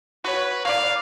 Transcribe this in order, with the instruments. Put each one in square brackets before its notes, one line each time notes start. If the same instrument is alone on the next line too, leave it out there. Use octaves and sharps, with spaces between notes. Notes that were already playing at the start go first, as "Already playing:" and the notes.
[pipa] F#4 C#5 [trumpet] B4
[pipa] A#3 C#5 D5 [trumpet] F5